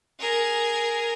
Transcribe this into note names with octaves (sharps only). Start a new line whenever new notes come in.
G#4 A#4